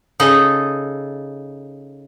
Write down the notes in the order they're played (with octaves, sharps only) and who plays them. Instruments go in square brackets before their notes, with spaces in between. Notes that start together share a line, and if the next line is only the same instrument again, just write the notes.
[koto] C#3 D#4 A4